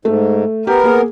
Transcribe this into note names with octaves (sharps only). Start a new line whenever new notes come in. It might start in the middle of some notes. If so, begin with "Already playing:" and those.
G#2 A3
B3 G4 A#4
A#3 G#4